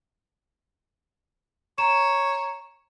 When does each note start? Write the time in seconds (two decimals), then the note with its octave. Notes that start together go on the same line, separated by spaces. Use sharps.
1.78 C#5 A#5 E7